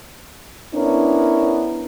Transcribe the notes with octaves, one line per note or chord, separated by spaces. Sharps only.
B3 C#4 D4 E4 A#4 C#5